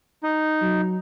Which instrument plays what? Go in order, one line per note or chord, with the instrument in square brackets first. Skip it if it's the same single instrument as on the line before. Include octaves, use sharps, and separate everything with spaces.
[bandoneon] D#4
[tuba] F#3